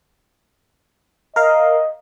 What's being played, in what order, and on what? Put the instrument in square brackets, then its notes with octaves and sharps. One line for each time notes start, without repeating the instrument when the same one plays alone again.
[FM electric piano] A#4 F5 [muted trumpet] D#5